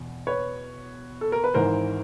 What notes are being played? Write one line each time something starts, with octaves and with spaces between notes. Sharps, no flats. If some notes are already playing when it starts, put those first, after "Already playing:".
Already playing: E2 B2
B4 C#5
A4
A#4
B4
G#1 G#2 E3 A#4 C5